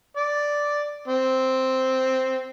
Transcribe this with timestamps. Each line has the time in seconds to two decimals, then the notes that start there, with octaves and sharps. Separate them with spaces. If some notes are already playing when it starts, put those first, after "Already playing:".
0.17 D5
1.08 C4